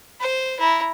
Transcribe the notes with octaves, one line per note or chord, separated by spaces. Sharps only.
C5
E4 A#5